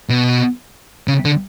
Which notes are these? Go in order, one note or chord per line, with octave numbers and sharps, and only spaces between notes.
B2
C#3
D3